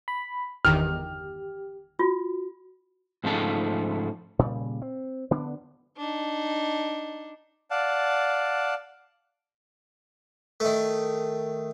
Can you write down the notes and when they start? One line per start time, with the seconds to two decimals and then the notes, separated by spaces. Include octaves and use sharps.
0.08 B5
0.65 G1 E2 D#3 G4 F6
1.99 F4 F#4
3.24 G#2 C#3 F3 A3 D#4 A5
4.39 A#2 C#3 G3
4.82 C4
5.31 D3 B3 D4
5.97 D4 D#4
7.71 D5 F5 F#5 A5
10.60 D#3 A3